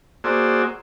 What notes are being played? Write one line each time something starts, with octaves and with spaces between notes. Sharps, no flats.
A#3 F#4 G#4 C5 D5 E6